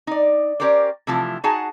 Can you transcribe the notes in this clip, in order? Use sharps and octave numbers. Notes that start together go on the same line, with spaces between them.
D#4 D5
C#4 G4 A#4 C5 D5
C3 E3 F3 A3 E4 F4
D#4 F#4 G#4 F#5 G#5 A5